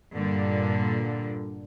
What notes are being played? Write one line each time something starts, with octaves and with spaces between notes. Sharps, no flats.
G2 A#2 D3